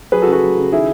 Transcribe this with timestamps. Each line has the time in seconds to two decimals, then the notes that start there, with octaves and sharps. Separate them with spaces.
0.12 F#3 G#4 B4
0.22 F#4 A4
0.27 C#3
0.32 F#4 A4
0.42 F#3
0.57 C#3
0.72 D#3 E4 G#4